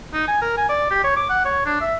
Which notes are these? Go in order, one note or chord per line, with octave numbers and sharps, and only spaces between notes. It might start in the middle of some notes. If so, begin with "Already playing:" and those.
D#4
G#5
A#4
G#5
D5
G4
C#5
D6
F#5
C#5
D4
E5